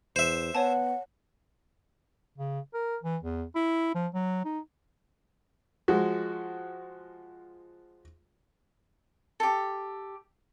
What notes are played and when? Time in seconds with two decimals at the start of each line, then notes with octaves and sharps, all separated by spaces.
0.16 E2 C5 E5
0.55 B3 C#5 F#5 G#5 A5
2.38 C#3
2.74 A#4
3.03 E3
3.23 E2
3.55 E4
3.95 F3
4.14 F#3
4.45 D#4
5.88 F3 G#3 F#4
9.40 G4 A4